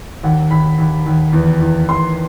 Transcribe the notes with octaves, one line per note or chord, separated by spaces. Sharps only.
D#2 F#5
D#2 B5
D#2
D#2
E2
E2
E2 C6